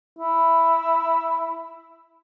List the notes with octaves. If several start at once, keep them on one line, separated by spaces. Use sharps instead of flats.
E4